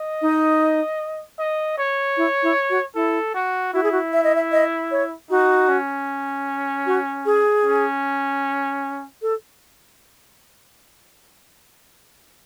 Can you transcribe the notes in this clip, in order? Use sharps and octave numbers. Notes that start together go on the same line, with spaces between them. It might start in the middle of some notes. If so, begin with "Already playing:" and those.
Already playing: D#5
D#4
D#5
C#5
E4
E4
F#4
E4 A4
F#4
E4 F#4
G#4
F#4
E5
D#5
E5
D#5
C#5
D#4 F#4
C#4
F#4
G#4
C#4
A4